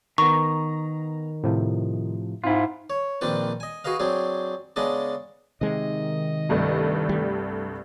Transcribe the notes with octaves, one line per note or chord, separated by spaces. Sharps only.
D#3 B3 A#5 C#6
A2 C3 F3
G#2 C4 E4 F4
C#5
A#1 D#3 C4 D4 B4 A5
D#5 G#5
F#4 G#4 B4 D#5 F5
F#3 C4 D4 G#4
C#3 G#3 B3 D4 D#5 A5
C3 D#3 G#3 D#5
C2 G2 A3
G3